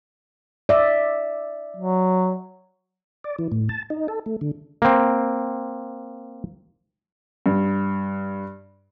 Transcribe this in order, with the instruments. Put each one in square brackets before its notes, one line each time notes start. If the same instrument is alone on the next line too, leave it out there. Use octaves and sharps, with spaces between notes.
[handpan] D5 E5
[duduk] F#3
[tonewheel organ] D5
E3
A2
A5
D#4
A4
A3
D3
[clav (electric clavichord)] A#3 C4
[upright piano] G2